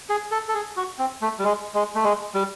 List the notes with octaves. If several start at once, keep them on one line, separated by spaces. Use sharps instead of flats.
G#4
A4
A4
G#4
F#4
C4
A3
G3
G#3
G#3
A3
G#3
G3